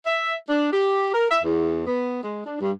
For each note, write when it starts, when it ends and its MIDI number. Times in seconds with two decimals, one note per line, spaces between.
0.07 0.35 76
0.50 0.70 62
0.72 1.13 67
1.14 1.26 70
1.31 1.40 76
1.44 1.85 40
1.87 2.22 59
2.23 2.46 56
2.46 2.57 62
2.61 2.72 43